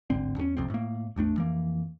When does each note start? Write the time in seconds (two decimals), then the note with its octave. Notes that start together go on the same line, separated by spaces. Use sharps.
0.10 D1 G#1 D3 C4
0.36 E2 G2 C#4
0.57 D#1 C2 F2 C4
0.70 A2 A#3
1.16 A1 E2 A3 D4
1.36 F2 E3 A#3